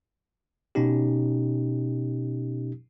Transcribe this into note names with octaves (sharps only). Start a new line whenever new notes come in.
B2 C#4 D#4 G4